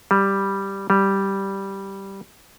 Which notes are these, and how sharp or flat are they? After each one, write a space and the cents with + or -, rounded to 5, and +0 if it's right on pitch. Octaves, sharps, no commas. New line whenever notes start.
G3 +0
G3 -5